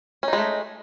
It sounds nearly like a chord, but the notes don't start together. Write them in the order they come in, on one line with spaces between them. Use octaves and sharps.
C#4 D#4 G#3 A3